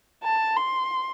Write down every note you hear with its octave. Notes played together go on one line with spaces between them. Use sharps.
A5
C6